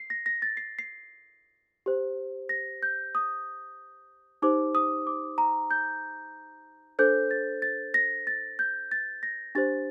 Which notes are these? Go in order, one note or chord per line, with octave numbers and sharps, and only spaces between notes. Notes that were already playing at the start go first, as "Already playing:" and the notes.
Already playing: C7
A#6
A#6
A6
C7
C7
G4 C5
A#6
G6
D#6
D#4 G4 C5 D6
D#6
D6
A#5
G6
D4 A4 C5 G6
A6
A6
A#6
A6
G6
A6
A#6
D4 G4 C5 A6